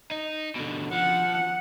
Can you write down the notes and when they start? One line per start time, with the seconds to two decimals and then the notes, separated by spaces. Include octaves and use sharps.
0.11 D#4
0.56 B2 D3
0.93 F3 F#5